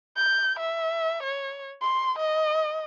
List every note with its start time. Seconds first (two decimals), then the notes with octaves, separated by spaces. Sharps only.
0.17 G6
0.60 E5
1.23 C#5
1.82 C6
2.19 D#5